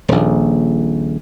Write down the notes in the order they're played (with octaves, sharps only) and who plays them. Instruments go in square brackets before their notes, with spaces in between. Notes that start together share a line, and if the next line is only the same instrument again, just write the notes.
[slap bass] D#1 A#1